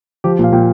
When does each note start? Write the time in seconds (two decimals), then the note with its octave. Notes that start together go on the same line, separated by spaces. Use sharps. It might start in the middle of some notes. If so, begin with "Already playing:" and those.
0.24 F3 G4
0.39 A#2
0.44 F5
0.52 A#2 G5